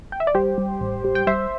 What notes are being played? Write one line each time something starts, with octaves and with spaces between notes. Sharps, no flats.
G5
E5
D5
G3 G4 C5
G3
A1
G3
G5
G3 C5 E5